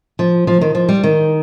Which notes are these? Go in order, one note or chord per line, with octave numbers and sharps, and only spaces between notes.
F3
F3
D#3
F3
G3
D#3